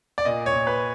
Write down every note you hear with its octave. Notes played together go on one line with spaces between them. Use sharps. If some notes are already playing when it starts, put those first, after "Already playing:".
D5
A#2 D#5
C#5
A#2
B4